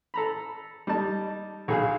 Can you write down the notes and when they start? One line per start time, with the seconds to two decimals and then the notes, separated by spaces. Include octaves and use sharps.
0.14 A4 A#5 B5
0.87 G3 D#4 A5
1.68 B1 G#4 F5